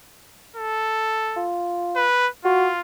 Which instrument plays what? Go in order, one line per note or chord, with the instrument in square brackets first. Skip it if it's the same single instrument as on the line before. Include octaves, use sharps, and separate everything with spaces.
[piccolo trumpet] A4
[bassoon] F4
[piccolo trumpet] B4
[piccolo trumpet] F4 [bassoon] F#4